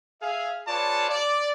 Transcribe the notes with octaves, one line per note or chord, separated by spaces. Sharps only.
G#4 E5 F5
F4 G#4 B4 C#5 D5 A5
D5